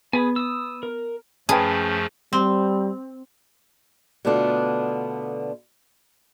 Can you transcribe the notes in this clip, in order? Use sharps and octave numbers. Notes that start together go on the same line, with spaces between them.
B3 G#4 B4 G#5
D#6 E6
A#4
F#2 F3 A3 C#4 G#4 B4 G5 A5
G3 C4
B2 D3 A3 B3 D4 F4